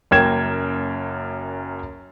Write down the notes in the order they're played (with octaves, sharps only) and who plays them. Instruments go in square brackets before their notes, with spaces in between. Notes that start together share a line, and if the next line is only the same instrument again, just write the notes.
[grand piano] F#1 F#2 A#3 G5 G#6 E7